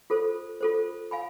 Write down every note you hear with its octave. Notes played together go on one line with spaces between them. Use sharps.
F4 A4 C5
F4 A4 C5
F5 G#5 B5